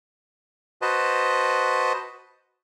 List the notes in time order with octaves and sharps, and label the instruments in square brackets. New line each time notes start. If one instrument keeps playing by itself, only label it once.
[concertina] F#4 B4 C5 D#5 A5